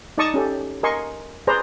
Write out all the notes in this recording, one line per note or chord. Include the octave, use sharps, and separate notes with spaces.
D#4 D5 D#5 A5 C#6 D#6
C#4 G4 A4
A#4 D#5 G#5 C6 C#6
G#4 B4 C5 D5 A#5